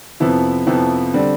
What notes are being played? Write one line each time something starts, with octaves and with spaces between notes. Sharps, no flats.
F2 C3 F3 B3 E4
F2 C3 F3 B3 E4
D3 G3 C4